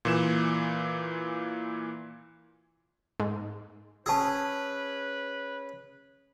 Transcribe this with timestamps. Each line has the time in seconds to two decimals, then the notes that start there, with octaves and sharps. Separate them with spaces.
0.05 A#2 E3 E7
3.20 G#2
4.06 C#4 G#4 B4 A5 E6